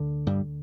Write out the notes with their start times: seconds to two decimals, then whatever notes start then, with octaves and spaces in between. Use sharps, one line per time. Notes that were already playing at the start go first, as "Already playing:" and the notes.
Already playing: D2 D3
0.26 G2 G3